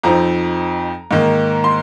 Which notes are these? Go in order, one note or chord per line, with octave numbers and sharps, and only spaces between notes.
F2 F3 C4 D#4 A#5
G#2 D#3 A#3
C6